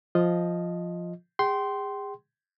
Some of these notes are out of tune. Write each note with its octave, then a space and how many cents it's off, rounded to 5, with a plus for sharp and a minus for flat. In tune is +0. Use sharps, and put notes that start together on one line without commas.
F3 +0 F4 +0 D#5 +0
G#4 -35 G5 -30 C6 +0